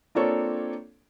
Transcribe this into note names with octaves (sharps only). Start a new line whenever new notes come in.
A#3 C4 D4 F4 A4 C#5